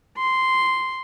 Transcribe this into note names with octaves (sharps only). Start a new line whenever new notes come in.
C6